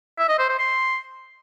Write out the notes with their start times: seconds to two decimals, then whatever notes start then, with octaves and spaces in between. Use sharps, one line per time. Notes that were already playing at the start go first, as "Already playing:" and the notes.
0.18 E5
0.29 D#5
0.39 C5
0.49 C5
0.59 C6